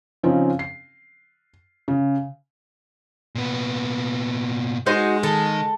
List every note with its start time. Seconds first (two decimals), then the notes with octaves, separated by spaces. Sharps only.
0.23 C#3 F3 C4 C#4 D#4
0.59 C7
1.88 C#3
3.35 A#2 B3
4.86 G#3 D#4 F#4 C5
5.23 D#3 A4